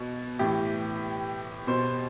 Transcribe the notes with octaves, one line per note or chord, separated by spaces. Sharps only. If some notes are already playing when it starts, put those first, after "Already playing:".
Already playing: B2
A2 E3 G4
B2 C5